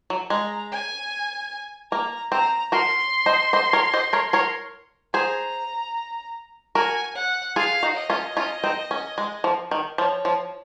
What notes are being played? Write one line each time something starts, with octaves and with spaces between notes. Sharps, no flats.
F#3
G#3 A#5
G#5
A#3 A#5
C4 A#5
F#4 A#4 C6
C5 D#5
C5 D#5
A#4 C#5
C5 D#5
A#4 C#5
A#4 C#5
G#4 C5 A#5
F#4 A#4 G#5
F#5
F4 G#4 F5
D#4 F#4
D#5
C#4 F4
C#4 F4
C4 D#4
C#4
G#3
F3
D#3
F3 C#5
F3